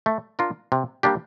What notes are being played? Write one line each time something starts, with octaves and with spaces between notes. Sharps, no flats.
A3
D4 F4 A#4
C3
G3 A#3 D4 G4